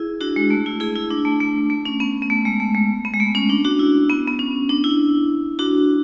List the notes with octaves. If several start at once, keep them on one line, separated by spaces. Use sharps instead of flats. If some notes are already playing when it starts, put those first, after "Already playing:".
Already playing: E4 G#4
D4 F#4
G#3
A3
E4
E4 G#4
E4
D4
A3
A3
A3
C#4
B3
B3
A3
G#3
A3
G#3
B3
G#3
A3
C#4
D4
D4 F#4
E4
B3
B3
C#4
D4
E4
D4 F#4